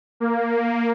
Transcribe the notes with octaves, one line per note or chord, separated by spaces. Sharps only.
A#3